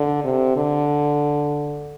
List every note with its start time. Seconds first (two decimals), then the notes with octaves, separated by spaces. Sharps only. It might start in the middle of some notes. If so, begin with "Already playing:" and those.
Already playing: D3
0.24 C3
0.56 D3